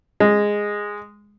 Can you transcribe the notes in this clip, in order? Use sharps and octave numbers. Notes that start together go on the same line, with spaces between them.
G#3